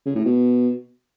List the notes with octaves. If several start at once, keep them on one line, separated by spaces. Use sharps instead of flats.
C#3
A2
B2